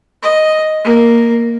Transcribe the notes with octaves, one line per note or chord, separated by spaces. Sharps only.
D#5
A#3